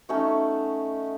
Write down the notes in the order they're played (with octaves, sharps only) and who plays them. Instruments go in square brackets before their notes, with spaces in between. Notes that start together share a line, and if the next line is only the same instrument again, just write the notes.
[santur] A3 C#4 D#4 F#4